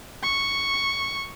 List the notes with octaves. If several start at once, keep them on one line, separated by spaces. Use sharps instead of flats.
C#6